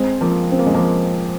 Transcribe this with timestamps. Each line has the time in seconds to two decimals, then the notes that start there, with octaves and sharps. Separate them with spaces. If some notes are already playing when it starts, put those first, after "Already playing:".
Already playing: G#3 C4
0.21 F3 A#3
0.51 C4
0.59 A#3
0.66 G#3
0.74 F3 A#3